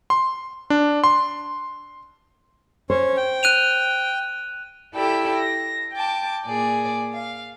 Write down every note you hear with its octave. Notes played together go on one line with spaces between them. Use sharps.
C6
D4
C6
C#4 C5 C#5
G5
F#6 D#7 F7
E4 G4 A4 D5 G5 B5
A#6
G5 A5 D6
A#2 G#4 D5
F5